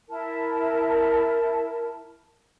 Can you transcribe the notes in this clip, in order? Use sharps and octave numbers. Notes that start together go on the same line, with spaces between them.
E4 A#4 A5